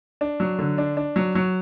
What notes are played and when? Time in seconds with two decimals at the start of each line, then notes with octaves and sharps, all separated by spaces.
0.21 D4
0.40 F#3
0.59 D3
0.78 D4
0.97 D4
1.16 F#3
1.35 F#3